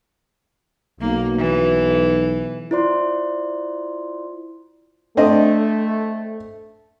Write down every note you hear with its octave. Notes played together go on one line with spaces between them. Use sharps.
B1 A#3
E3
E4 F4 C5 D5 C6
A3 C4 D4 D#5